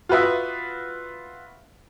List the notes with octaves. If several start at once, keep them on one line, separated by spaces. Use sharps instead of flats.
F4 F#4 B4 E5 D#6